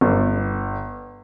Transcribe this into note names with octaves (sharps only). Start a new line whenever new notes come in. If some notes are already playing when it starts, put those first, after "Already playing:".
G1